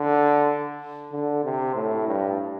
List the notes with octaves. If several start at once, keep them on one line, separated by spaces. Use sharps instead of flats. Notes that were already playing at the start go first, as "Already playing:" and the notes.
Already playing: D3
D3
C3
A2
G2